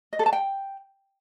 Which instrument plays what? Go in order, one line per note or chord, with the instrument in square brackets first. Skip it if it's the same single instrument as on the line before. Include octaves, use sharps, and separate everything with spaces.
[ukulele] D#5
A4
A5
G5